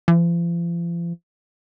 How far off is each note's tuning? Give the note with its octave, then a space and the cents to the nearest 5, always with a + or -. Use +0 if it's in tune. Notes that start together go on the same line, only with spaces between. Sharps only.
F3 -40